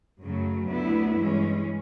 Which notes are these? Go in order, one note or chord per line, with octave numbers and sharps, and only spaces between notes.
F#2 C#3 F#3 A3
D2 D3 F#3 B3 E4
G2 E3 G#3 C#4